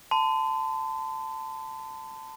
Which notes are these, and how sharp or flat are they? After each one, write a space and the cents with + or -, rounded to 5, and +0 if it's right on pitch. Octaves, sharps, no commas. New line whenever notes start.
A5 +10 C6 -40